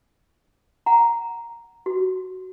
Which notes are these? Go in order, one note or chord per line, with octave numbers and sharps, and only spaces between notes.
F#5 A#5
F#4